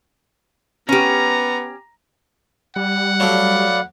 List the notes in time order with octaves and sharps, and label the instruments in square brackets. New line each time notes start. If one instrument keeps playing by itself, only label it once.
[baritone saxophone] B3 [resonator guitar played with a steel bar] C#4 G4 [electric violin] A#5
[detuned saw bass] G3 [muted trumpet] F#5
[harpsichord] F#3 A3 D4 [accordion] D5 F5 B5